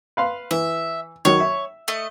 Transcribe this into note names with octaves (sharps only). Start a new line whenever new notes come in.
B4 F5 C6
E3 E5
D#3 F#3 C#5
E5
A3 D#5